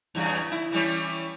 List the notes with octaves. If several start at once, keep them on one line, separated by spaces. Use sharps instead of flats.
E2 G2 C#3
E4
E3 G3 C#4